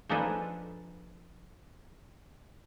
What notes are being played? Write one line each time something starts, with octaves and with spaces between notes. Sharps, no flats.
F3 D4 D#4 G#4 A4 B4